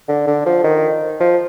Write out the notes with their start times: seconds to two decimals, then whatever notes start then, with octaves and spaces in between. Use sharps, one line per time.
0.08 D3
0.27 D3
0.46 F3
0.64 D#3
1.20 F3